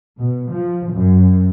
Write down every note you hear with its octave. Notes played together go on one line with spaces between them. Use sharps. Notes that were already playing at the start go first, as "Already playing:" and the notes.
B2
F3
F#2